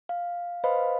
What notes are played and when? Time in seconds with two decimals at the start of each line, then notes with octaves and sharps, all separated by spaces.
0.09 F5
0.64 B4 C5 D#5 F5 B5